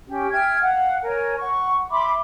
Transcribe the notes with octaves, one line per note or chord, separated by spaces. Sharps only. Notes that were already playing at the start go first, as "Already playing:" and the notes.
C#4 G4
E5 G5 F6 G#6
F5 F#5
A#4 C#5 G#5
F#5 C#6
E5 B5 C6 D6